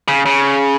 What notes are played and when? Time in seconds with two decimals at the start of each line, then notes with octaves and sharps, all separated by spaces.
0.08 C#3
0.26 C#3